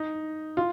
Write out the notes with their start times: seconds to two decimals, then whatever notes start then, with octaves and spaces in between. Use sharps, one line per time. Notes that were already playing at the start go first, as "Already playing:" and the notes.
Already playing: D#4
0.57 F4